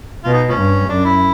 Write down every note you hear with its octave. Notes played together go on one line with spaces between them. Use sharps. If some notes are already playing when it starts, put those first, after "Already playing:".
B2 F4
D#4
F3 C#4
G2
F#2 D4
E4